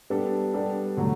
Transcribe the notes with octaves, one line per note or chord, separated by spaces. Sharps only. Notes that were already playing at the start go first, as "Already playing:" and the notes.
G3 B3 D4 A4
G3 B3 D4 A4
D3 F#3 A3